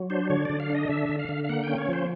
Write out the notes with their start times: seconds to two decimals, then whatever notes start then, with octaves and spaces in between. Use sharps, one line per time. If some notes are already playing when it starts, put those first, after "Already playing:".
Already playing: F#3
0.10 D4 C5
0.30 D3 C#5
0.45 D3 D5
0.60 F5
0.70 D4 D#5
0.89 D3 E5
1.09 D3
1.19 F5
1.29 D3
1.44 F5
1.49 A#3 F#5
1.64 C#4 G5
1.78 C#5
1.89 F3 C5